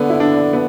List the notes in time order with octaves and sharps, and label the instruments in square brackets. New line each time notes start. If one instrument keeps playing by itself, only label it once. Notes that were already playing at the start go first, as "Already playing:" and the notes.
Already playing: [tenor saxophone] D3 [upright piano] B3
[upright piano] E4
D4
B3